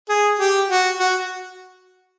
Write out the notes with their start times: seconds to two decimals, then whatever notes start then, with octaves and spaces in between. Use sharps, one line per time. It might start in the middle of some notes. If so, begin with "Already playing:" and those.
0.09 G#4
0.39 G4
0.69 F#4
0.99 F#4